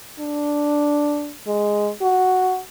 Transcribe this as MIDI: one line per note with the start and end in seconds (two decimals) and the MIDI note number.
0.19 1.32 62
1.47 1.91 56
2.02 2.59 66